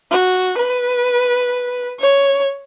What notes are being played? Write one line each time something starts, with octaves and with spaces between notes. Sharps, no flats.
F#4
B4
C#5